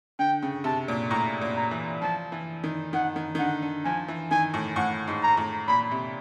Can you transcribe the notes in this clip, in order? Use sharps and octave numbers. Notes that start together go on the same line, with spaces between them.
D3 G5
C#3
C3 A5
A#2
A2 A#5
A#2
A#5
E3
F3 A5
E3
D#3
D#3 F#5
D#3
D#3
D3 F#5
D3
F3 G#5
E3
D#3 G#5
A2
A2 F#5
G#2
A#5
A2
A#2 B5
C3